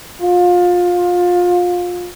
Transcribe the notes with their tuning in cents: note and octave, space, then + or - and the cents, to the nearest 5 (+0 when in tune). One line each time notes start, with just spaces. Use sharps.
F4 +25